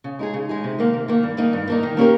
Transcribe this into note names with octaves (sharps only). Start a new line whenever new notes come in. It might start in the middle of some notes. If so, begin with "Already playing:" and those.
C#3
G#3 D#4 G#4
C#3
G#3 D#4 G#4
C3
D#3 A#3
C3
D#3 A#3
G2
D#3 A#3 D#4
G2
D#3 A#3 D#4
D#3
A#3 C#4 G4 A#4